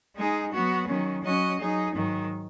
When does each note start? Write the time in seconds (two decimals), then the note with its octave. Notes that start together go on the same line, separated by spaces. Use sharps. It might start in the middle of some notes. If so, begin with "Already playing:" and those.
0.15 G#3 D#4 G#4
0.52 F#3 B3 F#4
0.87 D#3 F#3 C#4
1.22 F#3 C#4 F#4 D#5
1.59 F#3 D#4 G#4
1.94 G#2 D#3 F#3